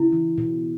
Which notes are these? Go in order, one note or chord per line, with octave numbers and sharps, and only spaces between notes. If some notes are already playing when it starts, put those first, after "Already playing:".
Already playing: C#3 E4
E3
B2